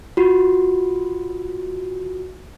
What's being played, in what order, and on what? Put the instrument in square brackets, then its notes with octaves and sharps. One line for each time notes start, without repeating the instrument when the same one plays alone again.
[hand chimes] F4 F#4